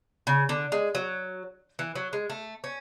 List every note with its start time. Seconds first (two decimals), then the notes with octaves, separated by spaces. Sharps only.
0.27 C#3
0.49 D3
0.72 G#3
0.95 F#3
1.79 E3
1.95 F#3
2.13 G#3
2.30 A3
2.64 C#4